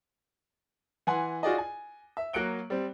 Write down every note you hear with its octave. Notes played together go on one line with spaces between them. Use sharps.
E3 F#5 G#5 C6
F4 F#4 G#4 D5 D#5
G#5
E5
F#3 A#3 F#6 C#7 D7 G7
G3 C4